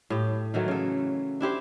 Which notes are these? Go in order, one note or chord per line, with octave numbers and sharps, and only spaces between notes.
A2 G4
D#3 E3 F#3 A3
C#3 A4
D4 E4 G4 C5